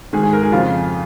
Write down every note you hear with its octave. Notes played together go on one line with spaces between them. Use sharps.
G#2 D#3 G#4
G#4
A#4
G#4
F2 C#3 F3 F4